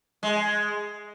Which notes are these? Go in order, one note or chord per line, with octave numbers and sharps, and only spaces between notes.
G#3